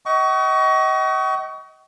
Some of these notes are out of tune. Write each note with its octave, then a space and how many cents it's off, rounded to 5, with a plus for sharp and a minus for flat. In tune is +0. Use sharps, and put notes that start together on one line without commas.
D#5 +25 F#5 +45 C#6 +25